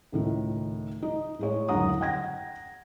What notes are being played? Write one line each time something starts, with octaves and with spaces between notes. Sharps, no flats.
C#2 A2 D#3
D#4
A2 G#3 C#5
F#1 D2 G#3 F#5 A#5 D#6
F#5 G5 G#6 A#6